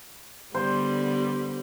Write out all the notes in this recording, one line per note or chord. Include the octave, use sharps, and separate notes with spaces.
D3 G3 B3 C5